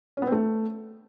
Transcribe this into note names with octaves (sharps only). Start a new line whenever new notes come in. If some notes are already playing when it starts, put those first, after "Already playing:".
C#4
B3
C4
A3